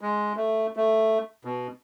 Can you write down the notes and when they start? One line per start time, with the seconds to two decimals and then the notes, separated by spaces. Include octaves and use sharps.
0.01 G#3
0.36 A3
0.76 A3
1.45 B2